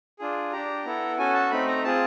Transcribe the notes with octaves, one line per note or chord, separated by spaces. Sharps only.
D4 F4 G#4
D4 G4 A#5
B3 E4 A4
C#4 F#4 A4 G#5
A5
A3 C4 D#4 B5
A#5
C4 F4 G#4 A5